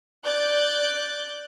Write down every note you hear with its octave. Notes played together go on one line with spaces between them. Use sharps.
D5 F#6 G6 A6